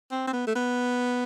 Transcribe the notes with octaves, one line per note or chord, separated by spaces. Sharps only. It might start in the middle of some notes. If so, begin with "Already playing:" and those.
C4
C4
B3
A3
B3